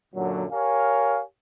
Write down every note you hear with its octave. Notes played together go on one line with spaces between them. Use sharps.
F#2 A#2 D3 F#3
G4 A#4 C#5 F5 G#5